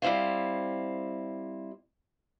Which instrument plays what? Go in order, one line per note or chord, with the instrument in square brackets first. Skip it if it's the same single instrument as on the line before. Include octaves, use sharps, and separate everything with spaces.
[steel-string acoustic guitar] G3 C4 E4 C5 F5